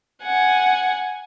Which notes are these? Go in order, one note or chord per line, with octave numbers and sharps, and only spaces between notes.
F#5 G#5